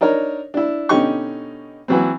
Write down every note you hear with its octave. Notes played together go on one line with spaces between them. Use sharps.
D4 D#4 A#4 C#5
D4 E4
B2 D3 C#4 D#4 G4 C#6
E3 F#3 C4